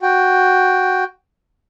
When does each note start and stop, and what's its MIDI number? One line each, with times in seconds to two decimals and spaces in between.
0.02 1.04 66
0.02 1.04 79